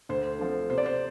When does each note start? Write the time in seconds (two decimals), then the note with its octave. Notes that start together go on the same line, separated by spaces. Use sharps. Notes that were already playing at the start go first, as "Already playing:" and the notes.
0.09 D2 C5
0.39 D3 F3 C4
0.70 C3 C5
0.78 D5
0.86 C5